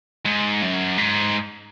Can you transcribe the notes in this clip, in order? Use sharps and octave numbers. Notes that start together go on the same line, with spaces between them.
G#2
F#2
G#2